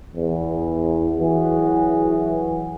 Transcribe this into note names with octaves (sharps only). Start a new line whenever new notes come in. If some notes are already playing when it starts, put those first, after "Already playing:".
E2
E3 F#3 F#4 G#4